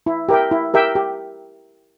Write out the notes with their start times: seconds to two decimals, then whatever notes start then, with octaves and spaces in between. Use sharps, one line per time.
0.06 E4
0.29 G4 A#4 E5 G5
0.51 E4
0.74 G4 A#4 E5 G5
0.95 G4